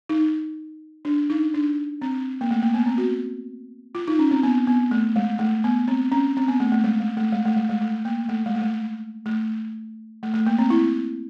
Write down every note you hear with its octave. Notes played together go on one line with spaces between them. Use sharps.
D#4
D4
D#4
D4
C4
A#3
A3
A#3
B3
C4
F#4
F4
D#4
C#4
C4
B3
B3
A3
G#3
A3
B3
C4
C#4
C4
B3
A3
A3
G#3
G#3
A3
G#3
A3
G#3
G#3
A3
A#3
A3
G#3
A3
G#3
A3
A3
A3
A#3
C4
E4